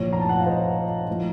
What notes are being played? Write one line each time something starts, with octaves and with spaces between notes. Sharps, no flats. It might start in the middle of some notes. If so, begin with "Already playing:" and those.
Already playing: A#1 A2 F3 C#5
A#5
A5
F#5
F5
C5 D#5
A2 F3